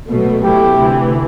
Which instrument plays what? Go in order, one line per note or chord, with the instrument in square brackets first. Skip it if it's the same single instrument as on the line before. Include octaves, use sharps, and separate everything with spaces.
[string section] B2 F#3 A3
[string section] B2 F#3 A3 E4 [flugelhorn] G4
[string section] D2 C3 E3